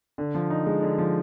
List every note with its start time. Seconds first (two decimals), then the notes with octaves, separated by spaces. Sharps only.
0.18 D3
0.35 F3
0.50 D#4
0.66 G#3
0.82 D3
0.98 F3